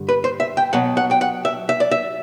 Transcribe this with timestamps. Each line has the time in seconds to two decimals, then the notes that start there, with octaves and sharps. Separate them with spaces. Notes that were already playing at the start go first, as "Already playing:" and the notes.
Already playing: G2 D3 G3
0.09 B4
0.24 C5
0.40 E5
0.57 G5
0.73 B2 F#3 F#5
0.97 F#5
1.11 G5
1.21 F#5
1.45 E5
1.69 E5
1.80 D5
1.91 E5